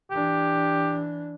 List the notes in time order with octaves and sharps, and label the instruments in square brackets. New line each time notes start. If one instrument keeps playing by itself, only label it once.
[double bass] E3 D4 [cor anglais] G4